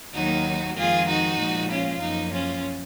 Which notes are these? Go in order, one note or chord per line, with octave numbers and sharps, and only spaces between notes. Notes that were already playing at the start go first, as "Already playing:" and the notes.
D#2 D#3 F#3 A#3 D#4 F#4
F2 D#3 G#3 F4 G#4
D#4 F#4
A#2 F3 G#3
C#4 F4
F#2 F3 A#3 D#4
C#4 F4